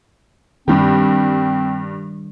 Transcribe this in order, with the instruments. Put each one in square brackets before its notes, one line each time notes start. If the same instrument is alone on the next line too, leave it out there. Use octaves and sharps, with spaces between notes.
[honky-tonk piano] G2 G4 [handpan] D#3 G3 D4 [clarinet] C4